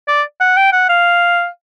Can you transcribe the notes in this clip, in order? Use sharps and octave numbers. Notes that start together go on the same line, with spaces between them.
D5
F#5
G5
F#5
F5